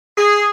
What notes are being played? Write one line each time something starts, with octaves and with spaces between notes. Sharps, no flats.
G#4